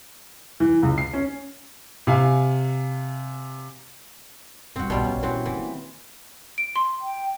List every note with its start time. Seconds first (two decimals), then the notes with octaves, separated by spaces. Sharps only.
0.60 E3
0.83 C#2
0.98 C7
1.13 C#4
2.07 C3 F5 G#5
4.76 G2 E3 C4 F#4
4.90 A#1 B2 G3 F4
5.04 A#1 C#4
5.23 A#2 E3 C4 F#4
5.46 D#3 E3 A#3
6.58 D7
6.76 C6
7.01 G5